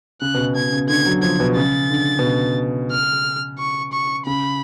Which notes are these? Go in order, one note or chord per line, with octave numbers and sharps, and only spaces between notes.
C#3 F#6
B2
C#3
B2 G#6
C#3
D3 G#6
F#3
F3 G#6
B2
C#3 A6
D3
B2
C#3
F6
C#6
C#6
C#3 B5